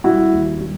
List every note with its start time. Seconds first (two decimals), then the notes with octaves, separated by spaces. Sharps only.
0.04 G3 E4 F#4
0.32 D#2
0.60 G3